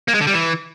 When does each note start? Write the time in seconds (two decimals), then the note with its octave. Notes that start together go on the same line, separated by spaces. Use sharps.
0.08 A#3
0.14 G#3
0.21 D3
0.27 G3
0.33 E3